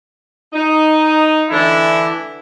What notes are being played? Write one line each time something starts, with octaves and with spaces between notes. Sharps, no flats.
D#4
D3 E3 A3 D4 E4